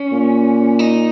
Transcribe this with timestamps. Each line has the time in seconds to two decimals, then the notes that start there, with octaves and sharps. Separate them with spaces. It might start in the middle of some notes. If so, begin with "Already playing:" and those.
Already playing: C#4
0.12 A#2
0.79 D#4